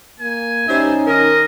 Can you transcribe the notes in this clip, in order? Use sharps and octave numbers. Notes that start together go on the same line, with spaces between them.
A#3 G#5
G3 C#4 D#4 C5 E5
D#3 A#4 D#5